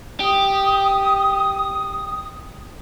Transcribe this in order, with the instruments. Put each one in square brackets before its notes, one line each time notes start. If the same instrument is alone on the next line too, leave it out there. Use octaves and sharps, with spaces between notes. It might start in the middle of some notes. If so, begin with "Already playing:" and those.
[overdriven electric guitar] G4 [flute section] D#6